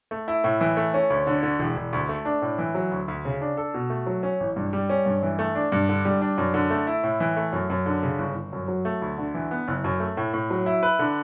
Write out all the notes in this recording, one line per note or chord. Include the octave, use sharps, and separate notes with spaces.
A3
E4
A2
E3
A3
C#4
D2
D3
D3
E1
E1
D2
A3
D4
A2
E3
F#3
D2
D2
C#3
D4
A4
B2
A3
F#3
C#4
A1
G2
G3
C#4
G2
E3
A3
D4
G2
D3
G3
D4
F#2
D3
A3
E4
A2
E3
A3
F#2
F#2
D3
C#3
G1
G1
F#2
F#3
A3
D2
D3
E3
B3
F#1
F#2
A3
A2
A2
F#3
E4
B4
D3